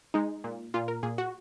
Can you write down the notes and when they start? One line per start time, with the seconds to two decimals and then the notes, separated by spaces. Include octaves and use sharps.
0.14 G#3 D#4
0.44 A#2
0.74 A#2 F4
0.88 A#4
1.03 A#2 G#4
1.18 F#4